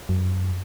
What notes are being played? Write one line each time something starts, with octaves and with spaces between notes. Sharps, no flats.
F#2